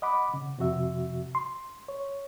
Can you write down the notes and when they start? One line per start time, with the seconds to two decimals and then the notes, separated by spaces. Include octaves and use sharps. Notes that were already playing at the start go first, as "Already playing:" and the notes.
0.02 D#5 F#5 B5 D6
0.34 C#3
0.58 F2 C3 F3 F#4 E5
1.35 C6
1.88 C#5